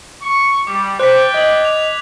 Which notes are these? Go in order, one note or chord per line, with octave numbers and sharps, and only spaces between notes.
C#6
G3 D6
C5 D5 G5 F#6 B6
D#5 G#6 F#7
F7